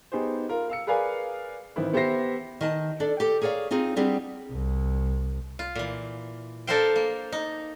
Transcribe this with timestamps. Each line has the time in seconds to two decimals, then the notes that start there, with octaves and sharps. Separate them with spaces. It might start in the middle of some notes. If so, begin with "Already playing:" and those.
0.12 B3 D#4 G4 G#4 C5
0.49 F4 A#4
0.69 F5 E6 C#7
0.87 G#4 A#4 B4 D5 F5 G#5
1.76 A1 D#3 C4 E4 B4
1.93 B3 G4 C5 E5 A#6 C7
2.61 D#3 D#5 A5
3.00 D4 A4 D5
3.20 G4 A4
3.42 G#4 A#4 C#5 D5 F5
3.71 C4 D#4 F4 G#4
3.96 G3 B3 C4 D4 G4 G#4
4.51 C2
5.59 F4
5.75 A#2 E3
6.67 D4 A4 A#4 C5 F5 G5
6.96 A#3
7.32 D#4